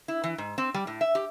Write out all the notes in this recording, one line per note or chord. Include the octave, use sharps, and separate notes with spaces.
E4
E3
G#2
C4
G3
A2
E5
G4